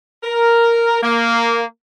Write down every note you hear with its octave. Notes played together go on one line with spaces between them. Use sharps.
A#4
A#3